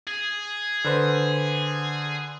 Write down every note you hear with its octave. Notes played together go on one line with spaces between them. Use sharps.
G#4
D3 B4 C5